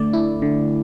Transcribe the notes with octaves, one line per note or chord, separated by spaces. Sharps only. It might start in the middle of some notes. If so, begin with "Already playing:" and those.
Already playing: D3 A3 D5
E4
D3